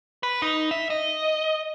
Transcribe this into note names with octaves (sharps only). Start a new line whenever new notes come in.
B4
D#4
E5
D#5